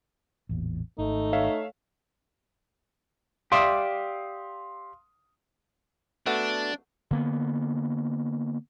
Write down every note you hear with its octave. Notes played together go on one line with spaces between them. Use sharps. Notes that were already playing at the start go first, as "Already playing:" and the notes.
A1 E2 A#2
G#1 A3 D#4
C#5 E5 F5
G4 D5 E5 F5 C6 D#6
A3 B3 D4 F#4
D3 A#3 B3